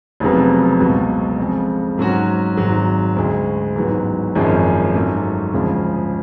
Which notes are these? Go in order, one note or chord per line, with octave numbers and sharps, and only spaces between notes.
F1 F2 C#3 F#3 B3
C#2 B2 F#3
F2 C#3 G#3
G#2 F#3 C#4 F#4
G#1 G#2 F#3
D2 C#3 G#3
A1 G#2 F#3 B3
G#1 F#2 F3 G#3 C#4
G#2 F#3 A3 C#4
D2 C#3 F3 G#3 C#4